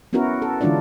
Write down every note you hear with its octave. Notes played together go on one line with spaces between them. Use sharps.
B3 C#4 E4 F#4 A#4
A4
D3 E3 G#3 D4 F4 D5